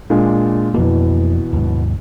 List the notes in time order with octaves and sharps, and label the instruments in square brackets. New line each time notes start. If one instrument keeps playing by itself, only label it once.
[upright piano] A#2 G#3 D4
[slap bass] F2 A#3 [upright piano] B2 E3
[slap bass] D#2 G#2